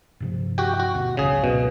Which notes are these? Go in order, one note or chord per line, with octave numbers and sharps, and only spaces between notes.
G2 C3 F3
F#4 G4 G5
F#4
D2 B2
G#1 C#2 F#2 C#3 G#4
B2